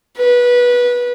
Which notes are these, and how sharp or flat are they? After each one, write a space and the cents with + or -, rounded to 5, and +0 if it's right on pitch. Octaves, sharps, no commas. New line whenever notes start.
B4 -20